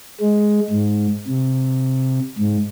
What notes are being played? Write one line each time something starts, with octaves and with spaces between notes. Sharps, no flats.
G#3
G#2
C3
G#2